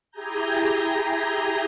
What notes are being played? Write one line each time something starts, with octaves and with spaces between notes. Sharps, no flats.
E4 G4 G#4 G#5 A#5 G6